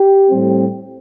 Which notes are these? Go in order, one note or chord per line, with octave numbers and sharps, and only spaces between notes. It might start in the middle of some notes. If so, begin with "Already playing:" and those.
Already playing: G4
A2 G3 C4